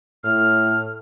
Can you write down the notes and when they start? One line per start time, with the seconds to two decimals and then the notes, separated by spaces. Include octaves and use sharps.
0.24 A2 F6